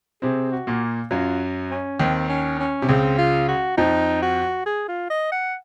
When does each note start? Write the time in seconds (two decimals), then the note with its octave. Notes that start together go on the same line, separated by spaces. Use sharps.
0.22 C3 C4 G#4
0.52 F#4
0.67 A#2 A#3
1.11 F#2 F#3 F4
1.71 C#4
1.99 D#2 D#3 C4
2.29 C#4
2.59 C#4
2.82 C3
2.89 C#2 C#3 C4
3.18 F4
3.49 F#4
3.78 F2 F3 D#4
4.22 F#4
4.66 G#4
4.88 F4
5.10 D#5
5.32 F#5